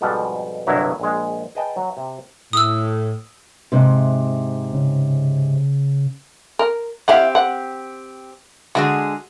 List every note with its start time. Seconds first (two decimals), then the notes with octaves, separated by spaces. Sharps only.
0.01 F2 G#2 B2 F3 G3 A4
0.67 G1 C2 G2 B2 F#3 E4
1.00 A#1 G#3
1.55 G#4 B4 D#5 G5 A5
1.76 F#3
1.97 C3
2.53 A2 D#6 E6
3.72 G#2 C3
4.73 C#3
6.59 A#4
7.08 C4 E4 G4 F5 F#5
7.35 F#5
8.75 D3 G#3 F#4 G#4